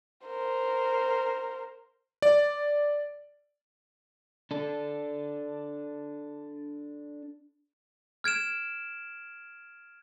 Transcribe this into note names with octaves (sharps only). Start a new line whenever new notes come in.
A#4 C5
D5
D4 A4
F6 G#6 D7 E7